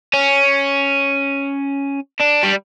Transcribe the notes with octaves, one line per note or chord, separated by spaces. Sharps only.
C#4
D4
G3